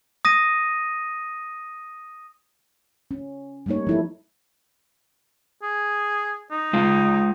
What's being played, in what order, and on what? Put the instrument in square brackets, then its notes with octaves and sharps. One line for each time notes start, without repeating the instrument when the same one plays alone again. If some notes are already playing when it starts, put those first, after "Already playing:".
[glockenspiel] D#6 A#6 D#7
[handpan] C#4
G3 A3 A#3 D#4 C#5
F3 E4 A4
[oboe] G#4
D#4
[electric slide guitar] G#3 F4 F5